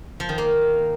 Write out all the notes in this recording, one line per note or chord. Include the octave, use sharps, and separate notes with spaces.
F3
D#3
A#3